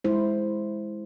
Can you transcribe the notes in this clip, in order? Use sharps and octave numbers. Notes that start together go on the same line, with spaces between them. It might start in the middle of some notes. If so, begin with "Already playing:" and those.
G#3 E4 C5